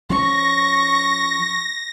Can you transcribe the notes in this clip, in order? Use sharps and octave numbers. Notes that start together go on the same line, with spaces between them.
F3 C#4 C#6 A#6